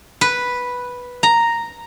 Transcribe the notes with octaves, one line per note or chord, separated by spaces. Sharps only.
B4
A#5